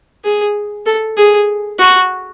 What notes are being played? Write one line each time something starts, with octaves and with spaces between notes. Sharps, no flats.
G#4
A4
G#4
F#4